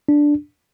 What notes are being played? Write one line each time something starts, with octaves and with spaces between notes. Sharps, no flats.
D4